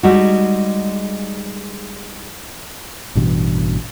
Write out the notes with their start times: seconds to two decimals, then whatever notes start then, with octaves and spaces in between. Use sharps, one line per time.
0.03 G3 G#3 D#4 F#4
3.15 A1 G2 B2 E3